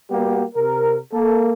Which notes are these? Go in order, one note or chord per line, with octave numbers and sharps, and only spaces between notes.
G3 A#3 B3 F#4 G4
C3 A#4
A#3 A4